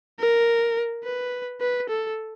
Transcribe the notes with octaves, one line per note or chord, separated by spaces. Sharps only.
A#4
B4
B4
A4